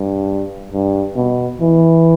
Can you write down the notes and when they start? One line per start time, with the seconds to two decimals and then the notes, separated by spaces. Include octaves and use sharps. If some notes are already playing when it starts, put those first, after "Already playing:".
Already playing: G2
0.72 G2
1.16 B2
1.61 E3